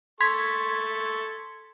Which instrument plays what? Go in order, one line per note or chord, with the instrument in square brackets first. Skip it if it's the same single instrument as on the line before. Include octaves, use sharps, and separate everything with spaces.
[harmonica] A4 C#6 [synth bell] C6 G#6 B6